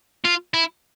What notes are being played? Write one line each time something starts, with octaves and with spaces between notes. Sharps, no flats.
F4
E4